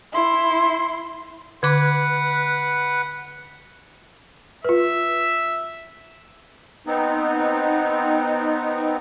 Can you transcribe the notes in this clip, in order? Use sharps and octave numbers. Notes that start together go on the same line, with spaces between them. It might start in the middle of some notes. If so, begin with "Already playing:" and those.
E4 C6
D3 B4 F#5 D6
F4 B4 E5
B3 C4 D#4